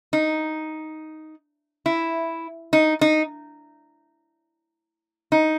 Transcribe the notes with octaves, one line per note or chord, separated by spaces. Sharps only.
D#4
E4
D#4
D#4
D#4